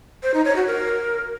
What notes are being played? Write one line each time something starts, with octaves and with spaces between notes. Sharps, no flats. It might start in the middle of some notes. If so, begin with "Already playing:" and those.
C5
D#4
C#5
F#4
A#4